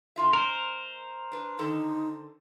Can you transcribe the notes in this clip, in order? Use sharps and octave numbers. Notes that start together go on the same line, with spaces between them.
D3 F4 E5
G#3 A#4 C5
D4 B4
D3 D#3 D#4 A4